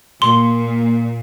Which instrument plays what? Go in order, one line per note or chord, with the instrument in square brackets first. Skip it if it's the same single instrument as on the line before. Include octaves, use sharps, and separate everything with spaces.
[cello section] A#2 [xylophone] C6